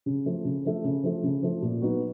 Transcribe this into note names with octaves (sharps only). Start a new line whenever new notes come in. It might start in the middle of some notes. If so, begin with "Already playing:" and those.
C#3
F3 A3
C#3
F3 A3
C#3
F3 A3
C#3
F3 A3
A#2
F#3 B3 D#4 F#4